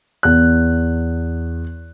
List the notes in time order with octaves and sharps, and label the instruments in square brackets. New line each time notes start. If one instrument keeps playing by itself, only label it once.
[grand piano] E2 F#6